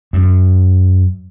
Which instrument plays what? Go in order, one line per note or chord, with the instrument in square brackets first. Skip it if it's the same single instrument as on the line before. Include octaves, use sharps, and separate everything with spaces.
[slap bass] F#2